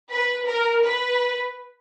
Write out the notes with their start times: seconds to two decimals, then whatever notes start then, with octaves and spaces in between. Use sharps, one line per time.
0.09 B4
0.46 A#4
0.83 B4